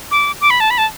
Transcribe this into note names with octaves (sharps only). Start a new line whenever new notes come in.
D6
D6
B5
A5
B5
A5